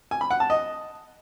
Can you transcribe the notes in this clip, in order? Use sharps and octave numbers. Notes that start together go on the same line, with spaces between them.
G#5
B5
F#5
A5
D#5